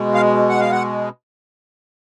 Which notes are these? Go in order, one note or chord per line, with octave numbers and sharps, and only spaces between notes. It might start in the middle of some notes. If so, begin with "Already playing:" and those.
Already playing: B2 G#3
F5
F#5
F5
F#5